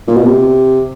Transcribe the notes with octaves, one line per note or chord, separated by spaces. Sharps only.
A#2
B2
C3